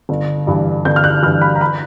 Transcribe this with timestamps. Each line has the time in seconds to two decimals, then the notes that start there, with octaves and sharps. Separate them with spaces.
0.09 G1
0.47 G2 E3
0.85 G1 G6
0.96 F6
1.04 F#6
1.22 G2 E3 F6
1.41 B5
1.55 A#5
1.61 B5